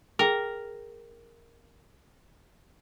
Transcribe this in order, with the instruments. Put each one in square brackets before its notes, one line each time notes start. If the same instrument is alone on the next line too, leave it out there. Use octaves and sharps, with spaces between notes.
[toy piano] G#4 G5 [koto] A#4